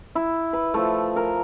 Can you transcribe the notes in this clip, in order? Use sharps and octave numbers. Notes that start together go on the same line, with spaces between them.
E4
B4
F3 A3
A#4